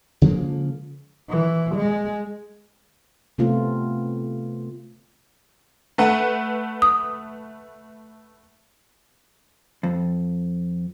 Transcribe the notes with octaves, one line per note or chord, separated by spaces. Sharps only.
C#3 F3 G#3 A#3
E3
G#3
C3 A3 B3 C4 F4
A3 B4 F#5
D#6
F2